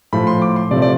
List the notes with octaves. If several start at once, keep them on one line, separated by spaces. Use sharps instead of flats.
A2 F3 A3 B5
C6
D6
C6
C3 F3 A3 D5
D5